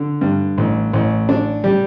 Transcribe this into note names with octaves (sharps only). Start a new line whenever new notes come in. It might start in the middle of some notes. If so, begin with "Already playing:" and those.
Already playing: D3
G2
A1
A1
D4
G3